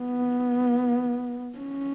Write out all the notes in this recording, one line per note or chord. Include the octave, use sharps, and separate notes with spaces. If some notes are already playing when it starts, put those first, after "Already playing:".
Already playing: B3
C#4